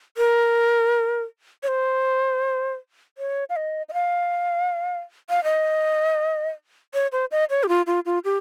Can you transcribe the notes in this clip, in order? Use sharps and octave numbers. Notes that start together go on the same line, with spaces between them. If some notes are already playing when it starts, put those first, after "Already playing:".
A#4
C#5
C5
C#5
F5
D#5
D#5
F5
F5
D#5
C#5
C5
D#5
C#5
G4
F4
F4
F4
G4